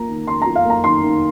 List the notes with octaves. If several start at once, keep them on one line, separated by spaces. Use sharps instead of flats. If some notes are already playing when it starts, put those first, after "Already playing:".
Already playing: A#3 F4 A#5
D#3
D#3 C6
A#5
F4
F5
A#3 A#5
D#3 C6
D#3